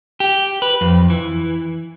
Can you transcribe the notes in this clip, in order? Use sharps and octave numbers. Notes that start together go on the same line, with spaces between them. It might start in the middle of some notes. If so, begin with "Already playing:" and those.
G4
B4
F2
E3